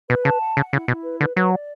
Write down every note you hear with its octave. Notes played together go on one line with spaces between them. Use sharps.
B2 B4
C#3 A5
F#5
C#3 F#5
C#3 E4
B2 E4
B4
D3 B4
F#3 B4
D5